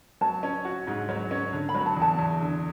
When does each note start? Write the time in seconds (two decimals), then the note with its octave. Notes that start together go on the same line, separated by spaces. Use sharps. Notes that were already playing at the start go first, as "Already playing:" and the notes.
0.21 F#3 A5
0.43 C#4
0.65 F#4
0.87 G#2
1.09 F#3
1.31 C#4
1.53 D3
1.69 B5
1.75 F#3
1.86 A5
1.97 E2 A5
2.18 E2
2.41 D3